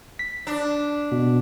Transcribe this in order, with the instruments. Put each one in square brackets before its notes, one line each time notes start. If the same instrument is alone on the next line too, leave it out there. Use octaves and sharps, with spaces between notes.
[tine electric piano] B6
[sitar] D4
[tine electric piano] B2